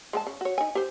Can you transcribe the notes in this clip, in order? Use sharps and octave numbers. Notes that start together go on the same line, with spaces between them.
G#3 G#4 A5
C#3
F#4 C#5
D#4 G#5
G4 C5